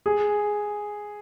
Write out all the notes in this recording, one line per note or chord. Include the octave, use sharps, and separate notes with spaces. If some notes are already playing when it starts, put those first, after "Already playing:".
G#4